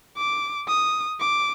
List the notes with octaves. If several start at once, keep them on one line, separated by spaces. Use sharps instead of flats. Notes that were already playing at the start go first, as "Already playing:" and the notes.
D6
D#6
D6